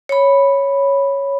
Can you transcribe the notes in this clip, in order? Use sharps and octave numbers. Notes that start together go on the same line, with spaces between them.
C#5 B5